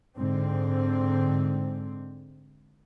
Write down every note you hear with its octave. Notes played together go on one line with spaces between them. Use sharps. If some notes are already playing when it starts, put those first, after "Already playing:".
G#2 D3 C4